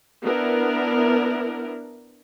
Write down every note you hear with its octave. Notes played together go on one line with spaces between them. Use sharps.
B3 D4 E4 A#4